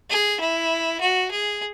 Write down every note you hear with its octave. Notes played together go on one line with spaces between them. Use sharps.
G#4
E4
F#4
G#4